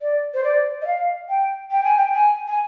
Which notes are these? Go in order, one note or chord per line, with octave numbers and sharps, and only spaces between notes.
D5
C5
D5
D#5
F5
G5
G5
G#5
G5
G#5
G#5